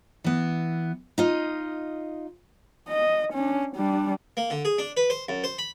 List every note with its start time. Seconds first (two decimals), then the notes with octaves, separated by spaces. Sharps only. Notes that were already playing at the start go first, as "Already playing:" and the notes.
0.24 E3 B3
1.18 D#4 F4 D#5
2.89 D#5
3.33 C#4 D4
3.76 G3 D4
4.37 A#3
4.50 D3
4.65 G#4
4.78 D4
4.97 B4
5.10 C5
5.29 F#2
5.44 C5
5.58 B5